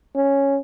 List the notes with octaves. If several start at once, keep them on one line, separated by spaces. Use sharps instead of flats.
C#4